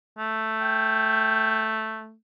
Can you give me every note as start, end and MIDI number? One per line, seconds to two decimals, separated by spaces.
0.18 2.14 57
0.61 1.74 79